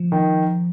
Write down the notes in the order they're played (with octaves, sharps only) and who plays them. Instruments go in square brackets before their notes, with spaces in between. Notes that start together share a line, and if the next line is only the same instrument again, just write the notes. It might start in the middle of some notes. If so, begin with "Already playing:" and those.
Already playing: [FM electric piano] F3
[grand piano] D#3